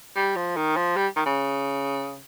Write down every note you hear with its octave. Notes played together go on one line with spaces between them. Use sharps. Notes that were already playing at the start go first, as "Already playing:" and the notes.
G3
F3
D#3
F3
G3
D#3
C#3